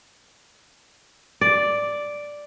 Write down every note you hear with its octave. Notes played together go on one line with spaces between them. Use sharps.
D5